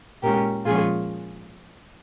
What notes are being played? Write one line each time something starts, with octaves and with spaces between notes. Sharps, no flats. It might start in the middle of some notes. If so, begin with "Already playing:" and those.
A#2 G#3 C#4 G4 A#4
A#2 F3 G#3 C#4 F4 G#4